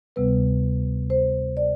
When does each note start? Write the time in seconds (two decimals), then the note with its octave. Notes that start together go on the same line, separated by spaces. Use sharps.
0.16 D2 C3 G3 B3 B4
1.10 C5
1.57 D5